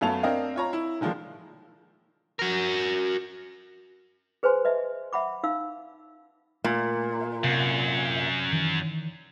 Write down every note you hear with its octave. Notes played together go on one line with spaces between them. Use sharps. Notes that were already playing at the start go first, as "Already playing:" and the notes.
F#2 A3 B3 F5 A5 F7
C4 D4 A#4 D#5 F5
F4 C#5 A#5
E4
D3 D#3 F3 G#3 A#3
F#4 A#4
G#4 B4 C5 G#5 C6
B4 D#5 E5
E5 F#5 B5 D6
D#4 F5 E6
A#2 A3
F#2 C3
D#3 E3